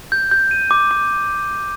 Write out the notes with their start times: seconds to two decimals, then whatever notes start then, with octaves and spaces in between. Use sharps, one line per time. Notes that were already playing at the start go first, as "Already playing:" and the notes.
0.12 G6
0.31 G6
0.51 D#7
0.71 D6
0.91 D6